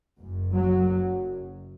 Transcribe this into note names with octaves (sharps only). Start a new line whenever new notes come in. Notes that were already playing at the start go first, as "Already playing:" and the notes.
F#1 F#2
F#3